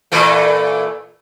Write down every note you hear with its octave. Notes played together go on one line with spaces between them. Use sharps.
A#2 E3 A3